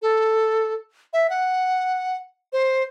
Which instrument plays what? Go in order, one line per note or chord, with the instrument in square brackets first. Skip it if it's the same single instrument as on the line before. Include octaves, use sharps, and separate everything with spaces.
[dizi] A4
E5
F#5
C5